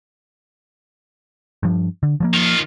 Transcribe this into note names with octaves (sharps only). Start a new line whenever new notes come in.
G2 F3
D3
F3 F#3 A#3
D#3 F4